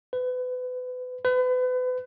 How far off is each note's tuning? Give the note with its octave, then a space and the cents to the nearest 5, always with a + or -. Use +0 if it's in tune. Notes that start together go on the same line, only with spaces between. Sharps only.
B4 +30
B4 +35